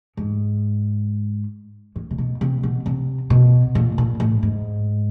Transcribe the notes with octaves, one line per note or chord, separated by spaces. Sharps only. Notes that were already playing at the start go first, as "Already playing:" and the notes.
G#2
A2
C3
B2
C3
B2
C3
B2
A#2
A#2
A2
G#2